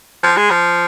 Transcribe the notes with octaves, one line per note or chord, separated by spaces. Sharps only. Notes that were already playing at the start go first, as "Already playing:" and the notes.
F3
G#3
F3